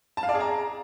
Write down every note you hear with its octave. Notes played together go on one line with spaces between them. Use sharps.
A5
F5
D5
G#4
A#5